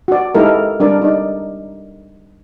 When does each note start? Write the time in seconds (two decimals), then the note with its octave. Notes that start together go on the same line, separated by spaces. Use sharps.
0.08 F#4 D5
0.35 G#3 D#4 E4 G4 A4 A#4
0.80 G3 D4 A#4 D5
1.02 D#4 D5